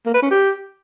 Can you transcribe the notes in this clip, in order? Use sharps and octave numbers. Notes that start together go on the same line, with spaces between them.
A#3
B4
C#4
G4